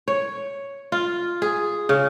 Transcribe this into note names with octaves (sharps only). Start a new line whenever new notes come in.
C#5
F4
G#4
C#3